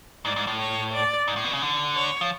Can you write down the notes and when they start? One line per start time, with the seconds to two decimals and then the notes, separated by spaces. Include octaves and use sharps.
0.25 G#2 D5
0.36 G#2
0.47 A2
0.59 C#5
0.93 D5
1.28 G#2
1.36 A2
1.44 B2
1.53 C#3
1.62 D3
1.96 C#5
2.21 F3